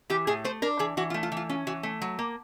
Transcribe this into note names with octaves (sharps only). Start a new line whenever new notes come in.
E3 G4
A2 G#4
A3 C5
D4 A#4
E3 G#4
E3 F#4
F4
A3
F4
E3
F4
C#4 F4
E3 F#4
A3
F#3
A#3